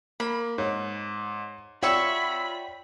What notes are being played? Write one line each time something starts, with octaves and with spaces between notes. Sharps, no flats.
A#3 B5
G#2 C#5
F4 C#5 D5 E5 F#5 G5 B5 C#6